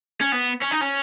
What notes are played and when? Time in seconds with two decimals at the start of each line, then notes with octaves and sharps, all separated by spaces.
0.21 C#4
0.32 B3
0.62 C#4
0.71 D#4
0.81 C#4